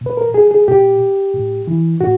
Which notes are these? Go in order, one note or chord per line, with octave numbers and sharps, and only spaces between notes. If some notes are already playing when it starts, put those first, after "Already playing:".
A#2
B4
A#4
G#4
G#4
A#2 G4
A2
E3
A2 F#4